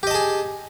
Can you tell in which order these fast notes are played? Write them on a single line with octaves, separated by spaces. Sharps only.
G4 D#5 A5 G#4